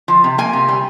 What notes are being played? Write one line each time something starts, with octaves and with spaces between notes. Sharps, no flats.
F3
C3
A#3 G#5
C3
G3